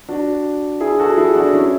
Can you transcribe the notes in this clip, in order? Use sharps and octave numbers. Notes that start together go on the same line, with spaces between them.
D4 F#4
E4 G#4
F#4 A4
E4 G#4
D4 F#4
C#4 E4